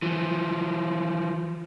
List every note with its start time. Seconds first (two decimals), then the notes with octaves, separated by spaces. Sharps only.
0.02 E3 F3